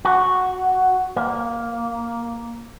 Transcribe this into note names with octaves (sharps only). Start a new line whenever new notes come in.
F#4
A#3